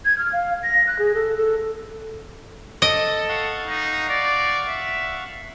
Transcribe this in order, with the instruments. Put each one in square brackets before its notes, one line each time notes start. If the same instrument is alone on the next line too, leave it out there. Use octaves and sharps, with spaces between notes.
[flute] G#6
F6
F5
A#6
F#6
G#4
A4
A4
[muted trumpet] A4 [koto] D#5
[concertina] F5 F#5 C#6
[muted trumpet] D#4
D5
E5